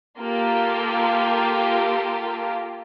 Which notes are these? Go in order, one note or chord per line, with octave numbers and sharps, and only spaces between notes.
A#3 F4 G4 A4